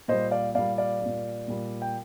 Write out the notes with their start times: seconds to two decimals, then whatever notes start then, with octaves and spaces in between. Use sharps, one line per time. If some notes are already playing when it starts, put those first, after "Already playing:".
0.08 A#2 G3 C5 D#5
0.31 D5 F5
0.55 A#2 G3 D5 F5
0.78 D5 F5
1.01 A#2 G3
1.48 A#2 G3
1.82 G5